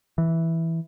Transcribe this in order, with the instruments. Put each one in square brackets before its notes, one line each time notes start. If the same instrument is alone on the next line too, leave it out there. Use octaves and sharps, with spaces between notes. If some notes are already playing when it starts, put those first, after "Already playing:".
[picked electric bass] E3